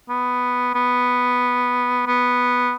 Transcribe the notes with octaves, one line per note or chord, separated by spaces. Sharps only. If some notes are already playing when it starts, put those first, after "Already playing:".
B3
B3
B3